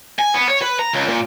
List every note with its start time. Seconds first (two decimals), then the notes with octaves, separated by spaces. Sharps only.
0.19 G#5
0.34 B3
0.49 C#5
0.62 B4
0.79 A#5
0.93 C#2
1.08 A#2